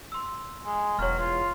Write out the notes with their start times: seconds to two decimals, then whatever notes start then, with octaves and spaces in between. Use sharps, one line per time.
0.12 C6 E6
0.65 G#3
0.99 E1 F#3 C#5 F6
1.19 F4